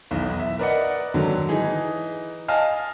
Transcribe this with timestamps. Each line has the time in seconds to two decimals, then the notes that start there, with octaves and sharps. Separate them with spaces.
0.11 B1 E2
0.39 E5
0.59 A#4 B4 D5 D#5 F#5
1.14 G#2 D3 D#3 F#3
1.49 E3 D#4 G#4
2.48 D#5 F5 G#5 A5 F6